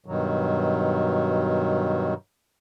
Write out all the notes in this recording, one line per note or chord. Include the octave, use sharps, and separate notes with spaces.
G2 B2 D#3 F#3